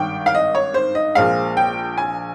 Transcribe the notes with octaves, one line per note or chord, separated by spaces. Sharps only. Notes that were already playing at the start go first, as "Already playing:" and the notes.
Already playing: G#1 G2 D#3 G5
F5
D#5
C#5
C5
D#5
A#1 A#2 F3 G#3 F5
G5
G#5